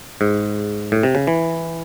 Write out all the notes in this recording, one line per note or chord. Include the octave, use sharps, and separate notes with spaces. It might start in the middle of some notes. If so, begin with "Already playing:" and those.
G#2
A2
C3
C#3
E3